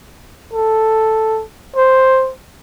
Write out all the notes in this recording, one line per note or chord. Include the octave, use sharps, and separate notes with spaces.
A4
C5